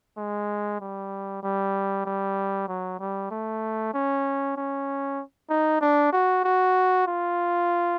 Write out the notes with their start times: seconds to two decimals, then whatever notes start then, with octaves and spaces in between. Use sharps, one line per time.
0.18 G#3
0.80 G3
1.43 G3
2.06 G3
2.68 F#3
3.00 G3
3.31 A3
3.94 C#4
4.57 C#4
5.50 D#4
5.81 D4
6.13 F#4
6.45 F#4
7.07 F4